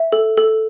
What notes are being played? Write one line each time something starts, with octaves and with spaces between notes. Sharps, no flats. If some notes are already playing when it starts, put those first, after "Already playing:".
Already playing: E5
A4
A4